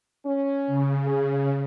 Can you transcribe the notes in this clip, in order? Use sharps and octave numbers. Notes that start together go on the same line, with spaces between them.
C#4
C#3
G#4